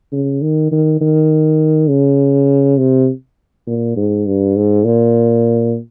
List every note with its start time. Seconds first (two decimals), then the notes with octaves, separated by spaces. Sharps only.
0.12 C#3
0.42 D#3
0.71 D#3
1.01 D#3
1.89 C#3
2.78 C3
3.67 A#2
3.96 G#2
4.26 G2
4.56 G#2
4.85 A#2